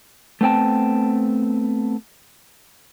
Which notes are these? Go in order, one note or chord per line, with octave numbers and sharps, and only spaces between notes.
A3 B3 C4 G5 A5